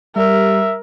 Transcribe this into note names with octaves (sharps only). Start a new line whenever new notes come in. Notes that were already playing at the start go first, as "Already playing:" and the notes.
G3 A#4 E5